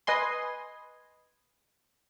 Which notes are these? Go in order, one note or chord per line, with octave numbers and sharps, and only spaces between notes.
B4 D#5 G#5 C6